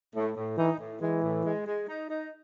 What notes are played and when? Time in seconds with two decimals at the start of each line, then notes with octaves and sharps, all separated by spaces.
0.14 A2 A3
0.37 A2
0.58 E3 D#4
0.79 A2
1.01 E3 G#3
1.23 A2
1.45 G#3
1.66 G#3
1.88 D#4
2.10 D#4